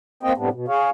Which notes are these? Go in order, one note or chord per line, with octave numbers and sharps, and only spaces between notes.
A#3 C4 D#5 G5
A2 C3 G3 B3 D4
B2
G#4 C#5 F5